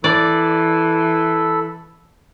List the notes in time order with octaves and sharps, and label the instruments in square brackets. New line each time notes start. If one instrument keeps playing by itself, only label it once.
[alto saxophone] E3 [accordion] A4 B5 E6 [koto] D5